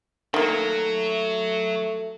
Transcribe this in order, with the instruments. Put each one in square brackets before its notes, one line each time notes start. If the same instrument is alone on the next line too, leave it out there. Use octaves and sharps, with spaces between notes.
[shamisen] D#3 A#3 [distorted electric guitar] F#3 [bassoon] A3